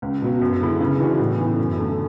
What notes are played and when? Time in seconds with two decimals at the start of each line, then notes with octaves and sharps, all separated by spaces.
0.02 C#2
0.22 B2 F#3 B3
0.41 F#2
0.60 D3 G#3 B3 E4
0.80 C#3
0.99 E3 B3 D4 F#4
1.19 A2
1.38 E3 B3
1.59 F#2
1.77 D3 A3